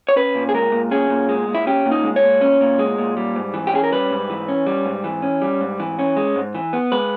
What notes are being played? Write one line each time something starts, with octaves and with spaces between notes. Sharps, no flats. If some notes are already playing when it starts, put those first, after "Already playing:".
C#5
C#4 B4
A#2
G#4
G#3 A#4
A#2
C#4 G#4
A#2
G#3
A#2
E4
C#4 G4
A#2
D#4
G#3
C#5
A#2
C#4
A#2
G#3
A#2
G3
G#2
E3
G4
C#4 G#4
A#4
G3 B4
G#2
E3
C#4
G3
G#2
E3
C#4
G3
G#2
E3
C#4
G#3
G#2
E3
B3
G#3 B4